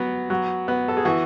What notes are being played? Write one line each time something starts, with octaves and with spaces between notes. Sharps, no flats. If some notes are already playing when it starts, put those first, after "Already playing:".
Already playing: F#3 B3
F#3
B3
A4
G#4
E3 F#4